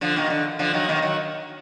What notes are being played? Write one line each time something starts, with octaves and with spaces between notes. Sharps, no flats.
D3 F3
B2 D#3
D3
D3 F3
D#3 F#3
B2 D#3
D#3 F#3